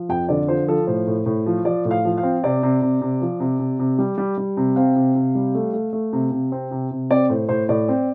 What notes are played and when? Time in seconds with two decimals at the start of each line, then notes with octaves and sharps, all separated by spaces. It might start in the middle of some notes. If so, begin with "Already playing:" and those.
Already playing: F3
0.09 F2 G5
0.29 D3 D5
0.48 F3 C5
0.68 F3 A4
0.87 A2 C5
1.07 A2
1.26 A2
1.46 F3
1.65 F3 D5
1.85 A2
1.91 F5
2.05 F3
2.18 F5
2.23 C4
2.44 C3 D5
2.63 C3
2.82 C3
3.01 C3
3.21 F3
3.40 C3
3.59 C3
3.79 C3
3.99 G3
4.18 G3
4.38 G3
4.57 C3
4.76 C4 F5
4.96 C3
5.15 C3
5.35 G3
5.55 A3
5.73 A3
5.93 A3
6.13 C3
6.32 C3
6.52 C4
6.71 C3
6.91 C3
7.11 C4 D5
7.29 A2 C5
7.49 A2 C5
7.69 A2 D5
7.88 C4